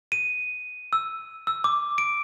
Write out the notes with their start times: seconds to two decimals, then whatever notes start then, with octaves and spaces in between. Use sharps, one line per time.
0.12 D#7
0.93 E6
1.47 E6
1.64 D6
1.98 D7